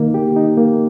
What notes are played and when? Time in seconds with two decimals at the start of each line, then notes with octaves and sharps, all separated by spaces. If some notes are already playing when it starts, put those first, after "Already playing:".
Already playing: D#3 A#3 D#4
0.14 G4
0.36 D#4
0.57 A#3